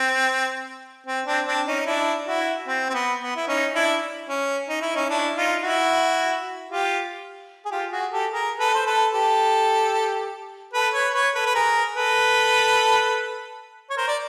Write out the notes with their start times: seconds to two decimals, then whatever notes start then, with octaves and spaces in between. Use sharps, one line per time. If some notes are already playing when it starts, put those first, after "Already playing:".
Already playing: C4
1.07 C4
1.26 C4 D4
1.47 C4 D4
1.67 C#4 D#4
1.86 D4 E4
2.27 E4 F#4
2.67 C4
2.89 C4
2.94 B3
3.22 B3
3.36 E4
3.48 C#4 D#4
3.75 D4 E4
4.29 C#4
4.69 D#4
4.82 E4
4.95 C#4 D#4
5.09 D4 E4
5.36 D#4 F4
5.63 E4 F#4
6.71 F4 G4
7.65 G#4
7.71 F4 G4
7.92 F#4 G#4
8.12 G4 A4
8.32 G#4 A#4
8.59 A4 B4
8.75 C5
8.87 A4 B4
9.13 G4 A4
10.74 A4 B4
10.94 B4 C#5
11.14 B4 C#5
11.35 A4 B4
11.46 B4
11.55 G#4 A#4
11.95 A4 B4
13.90 C#5
13.97 A#4 C5
14.07 D5